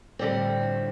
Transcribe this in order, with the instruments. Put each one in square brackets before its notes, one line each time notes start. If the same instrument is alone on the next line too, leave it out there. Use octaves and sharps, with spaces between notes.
[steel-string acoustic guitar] F2 D3 G3 C4 [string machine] A2